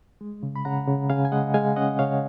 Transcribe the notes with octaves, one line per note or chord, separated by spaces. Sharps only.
G#3
C#3
B5
C#3 F#5 A#5
C#3
C#3 F5 G#5
G#5
G#3 D#5 F#5
G#3 F5 G#5
C#4 D#5 F#5
C#3 C#5 F5